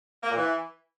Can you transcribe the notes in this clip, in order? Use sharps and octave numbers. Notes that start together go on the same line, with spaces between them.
A#3
A#2
E3